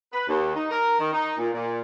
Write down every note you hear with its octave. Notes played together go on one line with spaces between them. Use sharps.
B4
D#2
D#4
A#4
D#3
D#4
A#2
A#2